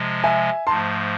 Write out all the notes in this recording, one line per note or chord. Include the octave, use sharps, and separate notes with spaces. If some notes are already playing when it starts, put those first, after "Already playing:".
Already playing: C3 F3 G#3
E5 G#5
G#2 F3 A3 A5 C6